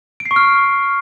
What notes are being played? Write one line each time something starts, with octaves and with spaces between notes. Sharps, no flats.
D7
C7
C#6
F6